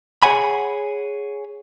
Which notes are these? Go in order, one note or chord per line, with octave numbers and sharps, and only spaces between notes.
G#4 C#5 F#5 G#5 B5